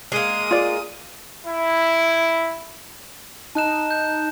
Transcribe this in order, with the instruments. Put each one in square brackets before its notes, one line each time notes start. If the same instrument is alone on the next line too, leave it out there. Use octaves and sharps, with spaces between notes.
[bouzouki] G#3 A#3 [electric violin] D#6
[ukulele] F4 D5
[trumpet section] E4
[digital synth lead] D#4 [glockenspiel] A5 F#6 E7
[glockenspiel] G6